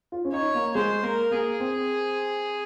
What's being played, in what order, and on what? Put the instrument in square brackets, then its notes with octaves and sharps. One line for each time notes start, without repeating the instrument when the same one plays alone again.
[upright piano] F4
C#4
[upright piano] D#4 [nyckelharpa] C#5
[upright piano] A#3
[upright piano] G#3 [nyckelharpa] C5
[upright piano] A#3 [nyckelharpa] A#4
[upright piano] A#3 [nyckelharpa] G#4
[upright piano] C4